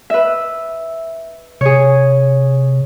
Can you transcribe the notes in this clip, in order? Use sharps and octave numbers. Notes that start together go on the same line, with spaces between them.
B4 E5
C3 G#4 C#5